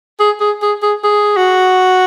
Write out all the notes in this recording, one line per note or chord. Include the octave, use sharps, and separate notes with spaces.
G#4
G#4
G#4
G#4
G#4
F#4